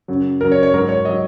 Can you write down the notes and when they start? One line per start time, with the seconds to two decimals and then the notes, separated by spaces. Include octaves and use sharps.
0.08 F#2 C#3 F#3
0.41 F#2 C#3 F#3 A#4
0.52 C#5
0.63 C#5
0.74 G#2 F#3 A#4
0.89 C#5
1.05 F#3 D#5